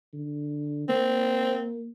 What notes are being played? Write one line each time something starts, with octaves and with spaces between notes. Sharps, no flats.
D3
A#3 C4